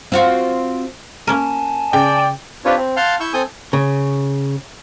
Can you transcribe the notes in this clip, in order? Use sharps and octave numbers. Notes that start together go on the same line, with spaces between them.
C4 F4 F#4
A#3 C#4 A#4 G#5 A5
C#3 D5 G5
C4 D4 F4 G4 B4 C#5
C4
F5 F#5 A5 C6 F6 G6
E4 C#6 E6 G6
C4 A4 G#5 D#6 G6
C#3